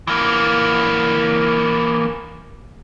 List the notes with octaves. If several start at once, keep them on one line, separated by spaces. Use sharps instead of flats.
E3 A#3